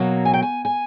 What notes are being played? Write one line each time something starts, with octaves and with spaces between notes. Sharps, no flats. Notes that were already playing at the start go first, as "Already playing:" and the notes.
Already playing: B2 F#3 A#3
G#5
G5
G#5
G#5